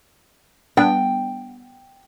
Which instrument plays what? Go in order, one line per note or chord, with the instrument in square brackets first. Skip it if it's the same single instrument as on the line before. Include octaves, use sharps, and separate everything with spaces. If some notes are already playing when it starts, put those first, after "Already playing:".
[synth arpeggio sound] G3 B3 D4 [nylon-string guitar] G5